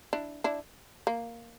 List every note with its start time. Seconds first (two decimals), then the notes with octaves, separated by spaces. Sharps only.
0.13 D4 E4
0.44 D4 E4
1.07 A#3